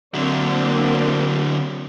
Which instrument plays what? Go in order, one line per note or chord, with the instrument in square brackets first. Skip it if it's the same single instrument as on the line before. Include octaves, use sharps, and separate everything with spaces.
[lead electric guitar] D3 F#3 [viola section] A#3 C4 D4